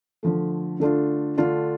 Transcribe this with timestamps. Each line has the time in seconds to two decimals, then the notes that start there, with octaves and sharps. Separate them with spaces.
0.23 D3 F3 A3
0.80 D3 A3 D4 F4
1.37 D3 A3 D4 F4